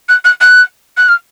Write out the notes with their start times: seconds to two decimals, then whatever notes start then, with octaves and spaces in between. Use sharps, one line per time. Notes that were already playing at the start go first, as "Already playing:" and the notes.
0.09 F#6
0.25 F#6
0.41 F#6
0.97 F#6
1.08 F6